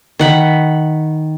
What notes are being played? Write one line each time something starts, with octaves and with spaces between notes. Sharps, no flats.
D#3 F#5 B5